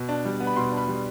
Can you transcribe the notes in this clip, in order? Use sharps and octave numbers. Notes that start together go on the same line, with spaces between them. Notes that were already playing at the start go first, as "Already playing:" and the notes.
Already playing: B2
D4
G3
B3
B5
B2 C6
D4
B5
G3